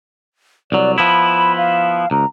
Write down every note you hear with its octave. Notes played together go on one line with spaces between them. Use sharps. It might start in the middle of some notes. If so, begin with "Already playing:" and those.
C2 F#3 D5
F3 B3 E4 B5
F5
C#2 A#5